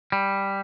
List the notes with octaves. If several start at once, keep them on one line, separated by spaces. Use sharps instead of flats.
G3